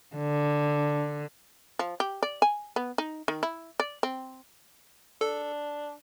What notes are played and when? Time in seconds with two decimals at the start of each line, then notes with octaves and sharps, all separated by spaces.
0.16 D3
1.79 F3
2.00 G4
2.23 D5
2.42 G#5
2.76 B3
2.98 D#4
3.28 D#3
3.43 E4
3.80 D5
4.03 C4
5.21 D4 A4